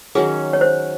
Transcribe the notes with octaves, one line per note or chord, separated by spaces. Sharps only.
D#3 F#3 C#4 G#4
C#5
C5